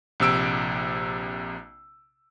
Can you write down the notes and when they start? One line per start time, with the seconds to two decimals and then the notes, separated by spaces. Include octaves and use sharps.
0.20 A#1 C3 E6 D7